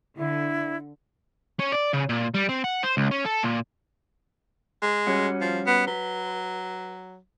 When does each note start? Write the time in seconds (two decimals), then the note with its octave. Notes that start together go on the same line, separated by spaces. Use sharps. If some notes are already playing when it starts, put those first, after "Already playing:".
0.17 D3 E4
1.60 C#4
1.72 D5
1.94 C#3
2.09 A#2
2.34 G3
2.49 C4
2.64 F#5
2.83 C5
2.97 C#2
3.11 C#4
3.25 A4
3.44 A#2
4.82 G#3
5.07 G3 C#4 F#4
5.41 F3
5.66 B3
5.87 F#3 B4